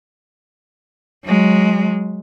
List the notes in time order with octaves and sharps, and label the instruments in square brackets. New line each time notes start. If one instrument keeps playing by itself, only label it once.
[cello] F#3 G#3